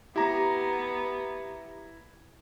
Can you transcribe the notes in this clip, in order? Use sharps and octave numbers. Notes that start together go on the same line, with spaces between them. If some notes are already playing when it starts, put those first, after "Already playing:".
B3 E4 G4 A#5